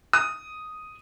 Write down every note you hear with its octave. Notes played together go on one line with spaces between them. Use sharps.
D#6